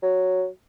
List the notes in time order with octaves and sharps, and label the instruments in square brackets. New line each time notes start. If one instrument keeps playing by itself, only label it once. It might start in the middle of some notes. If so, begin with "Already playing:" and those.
[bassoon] F#3